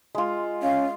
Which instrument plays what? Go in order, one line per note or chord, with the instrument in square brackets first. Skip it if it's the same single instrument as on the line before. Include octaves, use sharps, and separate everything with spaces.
[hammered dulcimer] G#3 F4
[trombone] C#4 [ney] F5